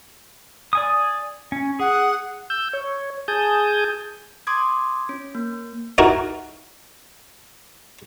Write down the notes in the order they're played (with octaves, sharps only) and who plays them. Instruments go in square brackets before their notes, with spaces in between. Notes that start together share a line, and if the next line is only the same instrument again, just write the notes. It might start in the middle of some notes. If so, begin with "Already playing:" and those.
[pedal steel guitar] D5 G#5 D#6
C#4
[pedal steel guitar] G#4 [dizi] F#5
[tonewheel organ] E6 G6
C#5
G#4 G#5 A5 D#6 G6
[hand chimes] C6 D6 D#6 G#6
C#4
A#3
[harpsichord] D#4 E4 F#4 A#4